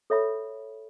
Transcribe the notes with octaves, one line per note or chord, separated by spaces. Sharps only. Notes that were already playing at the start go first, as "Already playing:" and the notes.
A4 C#5 E5 B5